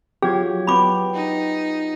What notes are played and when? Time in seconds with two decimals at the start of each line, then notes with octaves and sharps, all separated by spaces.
0.22 F#3 F4 G4 G#4 G#6
0.67 B3 G5 B5 D6
1.14 D#4